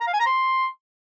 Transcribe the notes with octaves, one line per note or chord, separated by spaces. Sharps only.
A#5
F5
G#5
A#5
C6